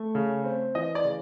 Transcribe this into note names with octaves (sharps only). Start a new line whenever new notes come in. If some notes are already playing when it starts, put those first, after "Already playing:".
Already playing: A3
C#3
C4
E3 D#5
D5
C#3